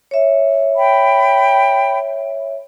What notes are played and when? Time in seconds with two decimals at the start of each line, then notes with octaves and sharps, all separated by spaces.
0.11 C#5 E5
0.77 G5 B5